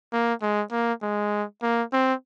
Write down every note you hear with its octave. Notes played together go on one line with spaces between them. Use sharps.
A#3
G#3
A#3
G#3
A#3
C4